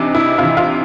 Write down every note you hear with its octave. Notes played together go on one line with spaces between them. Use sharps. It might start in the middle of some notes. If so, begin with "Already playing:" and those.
Already playing: C3 E3 D4 D#4
E4
C3 E3 F4
F4